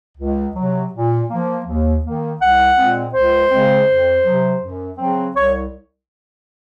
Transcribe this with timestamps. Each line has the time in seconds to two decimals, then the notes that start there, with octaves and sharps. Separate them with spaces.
0.18 C#2
0.56 C3 F#3
0.93 A#2
1.30 F3 A#3
1.66 D#2
2.04 D#3 A#3
2.40 C2 F#5
2.77 A#2 G#3 C4
3.13 C#2 C5
3.50 C#3 G#3 C4
3.88 F2
4.24 C3 F#3
4.61 F#2
4.98 C#3 F#3 C4
5.35 C2 C#5